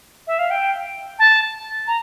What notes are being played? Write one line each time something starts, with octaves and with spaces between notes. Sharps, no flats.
E5
F5
G5
A5
A#5